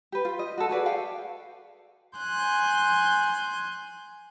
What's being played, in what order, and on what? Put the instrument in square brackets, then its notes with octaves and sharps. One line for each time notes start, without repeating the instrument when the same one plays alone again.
[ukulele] G4 B4
F4
D#5
F#4 A4
F#4 G#4 B4 D5
F5 G5
[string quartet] G#5 C6 F#6 G6